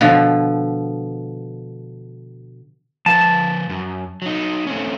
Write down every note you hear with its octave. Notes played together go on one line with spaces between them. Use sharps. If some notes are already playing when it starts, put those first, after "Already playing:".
B2 D3 F3
F3 B4 C5 A5
F#2
F#3 D#4
A3 C4 C#4